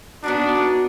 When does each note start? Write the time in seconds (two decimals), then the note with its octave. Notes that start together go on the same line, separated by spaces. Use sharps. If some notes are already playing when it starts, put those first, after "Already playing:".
0.24 B3 D4 D#4 F#4